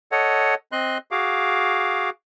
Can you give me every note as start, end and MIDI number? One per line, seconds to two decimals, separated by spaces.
0.12 0.55 69
0.12 0.55 73
0.12 0.55 75
0.12 0.55 78
0.72 0.98 60
0.72 0.98 75
0.72 0.98 84
0.72 0.98 90
1.11 2.10 66
1.11 2.10 68
1.11 2.10 77
1.11 2.10 86